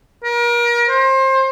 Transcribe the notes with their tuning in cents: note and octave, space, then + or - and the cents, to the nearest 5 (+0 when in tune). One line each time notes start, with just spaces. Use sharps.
A#4 +35
C5 +25